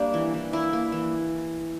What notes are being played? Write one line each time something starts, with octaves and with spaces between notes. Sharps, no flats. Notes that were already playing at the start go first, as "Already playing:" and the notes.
Already playing: G3 A#3 D4
E3
E3
A#3 E4
A#3
E3